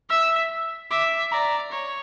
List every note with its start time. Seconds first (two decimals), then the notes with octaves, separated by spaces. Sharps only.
0.10 E5 E6
0.91 E5 D6
1.32 D5 A#5
1.72 C#5